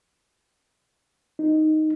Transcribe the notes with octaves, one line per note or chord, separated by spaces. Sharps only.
D#4